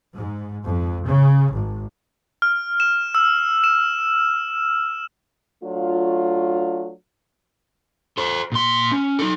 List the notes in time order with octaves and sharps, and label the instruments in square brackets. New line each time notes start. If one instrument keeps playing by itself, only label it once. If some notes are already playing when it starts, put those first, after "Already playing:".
[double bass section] G#2
F2
C#3
G#1
[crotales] F6
E7
E6
E7
[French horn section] F#3 A3 D4 F4
[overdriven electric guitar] A4 C5
A#2 C6
C#4
D#4 A4